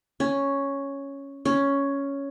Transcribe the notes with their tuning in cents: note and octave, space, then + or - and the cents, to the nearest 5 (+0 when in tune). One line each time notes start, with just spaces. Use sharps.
C#4 +0
C#4 +5